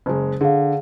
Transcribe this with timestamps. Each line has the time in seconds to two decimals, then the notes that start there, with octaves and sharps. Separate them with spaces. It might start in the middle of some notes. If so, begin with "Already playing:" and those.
0.06 F#1 G#3
0.41 D3 G#4 F5